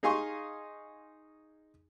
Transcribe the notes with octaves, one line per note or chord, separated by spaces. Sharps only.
D#4 G#4 F5 G#5 C6 C#6